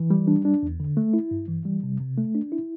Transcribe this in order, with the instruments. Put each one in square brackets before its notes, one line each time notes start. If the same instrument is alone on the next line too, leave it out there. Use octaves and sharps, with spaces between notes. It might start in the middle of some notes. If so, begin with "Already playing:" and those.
Already playing: [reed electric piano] E3
G3
D4
D4
E2
D3
A3
E4
G2
E3
G3
C3
C3
A3
D4
E4